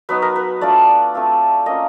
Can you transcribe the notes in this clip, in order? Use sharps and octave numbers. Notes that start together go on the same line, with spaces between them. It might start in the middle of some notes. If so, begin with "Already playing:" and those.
F#3 B3 D#4 B4
A#4
B4
A3 D4 F4 D5
A3 C4 F4
A#3 C#4 F4 D#5